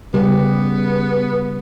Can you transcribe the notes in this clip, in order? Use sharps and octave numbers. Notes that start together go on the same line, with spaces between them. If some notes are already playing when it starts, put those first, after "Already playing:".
C#3 G3 B3 G4